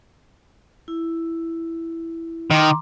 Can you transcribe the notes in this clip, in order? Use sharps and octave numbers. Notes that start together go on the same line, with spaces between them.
E4
D#3 A#5 C6 D6